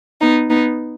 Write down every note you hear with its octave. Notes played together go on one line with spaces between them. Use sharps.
B3 D#4
B3 D#4